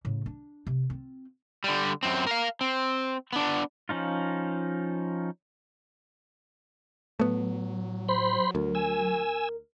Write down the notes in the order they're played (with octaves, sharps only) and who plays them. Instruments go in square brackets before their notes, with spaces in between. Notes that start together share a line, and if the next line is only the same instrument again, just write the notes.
[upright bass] A2 C#3
D4
C3
C4 F4
[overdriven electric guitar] D3 G3
F#2 C4
A#4 F5
C4
B3 D4
[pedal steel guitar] F3 C#4 D#4 F4
[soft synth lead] A2 [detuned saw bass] F#3 [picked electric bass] A3 B3
[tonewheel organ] C5 B5 C6
[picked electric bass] D2 [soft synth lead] A#4
[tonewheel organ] G#5 E6